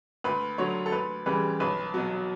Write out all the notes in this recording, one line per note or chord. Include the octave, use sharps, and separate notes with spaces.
D2 B4
D3 F#3 C#5
A4
D2 B4
C#3 E3 G3 B4
B1 B4
B2 F#3